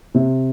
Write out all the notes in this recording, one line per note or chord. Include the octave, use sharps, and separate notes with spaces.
C3